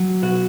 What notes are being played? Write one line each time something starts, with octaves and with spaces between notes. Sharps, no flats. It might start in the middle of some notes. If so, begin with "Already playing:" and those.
Already playing: F#3
B2 F#4